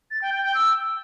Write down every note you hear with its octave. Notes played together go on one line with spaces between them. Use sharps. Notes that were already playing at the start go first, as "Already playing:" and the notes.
A6
G5
G5
G5
E6